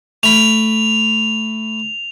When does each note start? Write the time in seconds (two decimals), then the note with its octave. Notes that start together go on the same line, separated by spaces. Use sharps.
0.23 A3 B5 F7